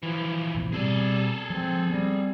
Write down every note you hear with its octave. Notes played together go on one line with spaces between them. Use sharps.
E3 F3
E1 A1 E2
B2 G3 C4 G#4 A4
F3 G3 G#3 C4
G3 B3 C4